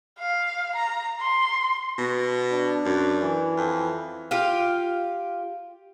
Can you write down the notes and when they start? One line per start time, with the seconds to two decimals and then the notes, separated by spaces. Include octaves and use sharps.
0.20 F5
0.77 A#5
1.21 C6
1.98 B2
2.52 D4
2.85 F#2
3.21 E3
3.57 F2
4.31 F4 G4 F5